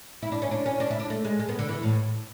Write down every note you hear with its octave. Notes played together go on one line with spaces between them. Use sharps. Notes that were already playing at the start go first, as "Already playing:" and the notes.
E4
D4
C#4
D4
C#4
D4
E4
D4
A3
G#3
G#3
B3
D3
E3
A2